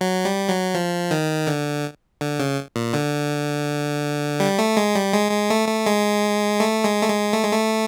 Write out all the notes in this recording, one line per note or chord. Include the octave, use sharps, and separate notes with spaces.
F#3
G3
F#3
F3
D#3
D3
D3
C#3
A#2
D3
G3
A3
G#3
G3
G#3
G#3
A3
A3
G#3
A3
G#3
A3
G#3
A3
G#3
A3